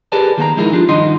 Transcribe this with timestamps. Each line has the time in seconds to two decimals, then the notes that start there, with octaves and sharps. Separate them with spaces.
0.12 G4 G#4 A#4 B4 D5 A5
0.37 D#3 A#3 F#5 A#5
0.57 F3 G#3 D#4 E4 G#4 A#4
0.72 G3 D4 F4
0.89 G2 D#3 D#4 F#4 D#5 C6